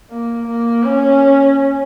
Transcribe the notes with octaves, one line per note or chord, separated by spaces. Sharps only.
A#3
A#3
C#4